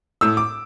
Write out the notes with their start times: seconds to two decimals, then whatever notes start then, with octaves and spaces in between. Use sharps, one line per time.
0.21 A2 E6
0.37 D6